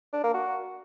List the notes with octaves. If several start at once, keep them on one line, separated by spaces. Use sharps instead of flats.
D4
A#3
F#4